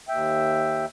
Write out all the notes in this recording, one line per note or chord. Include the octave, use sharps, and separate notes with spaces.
D#2 E5 G5